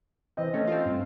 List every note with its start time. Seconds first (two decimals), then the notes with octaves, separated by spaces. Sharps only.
0.37 C3 E3 D#5
0.54 A3 C#4
0.67 C4 F4
0.85 G2